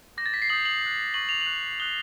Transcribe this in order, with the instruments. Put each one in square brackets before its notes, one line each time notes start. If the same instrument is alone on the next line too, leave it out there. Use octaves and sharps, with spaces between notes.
[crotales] D6 G6 A#6
A6
B6
C7
D#6 G6 F#7
F#7
D#6 F#6
C#6 F#6 F#7
F7
F#7
C#6 F#6
D#6 F#6 G7